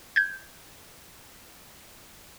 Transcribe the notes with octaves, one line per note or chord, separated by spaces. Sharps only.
G6 G#6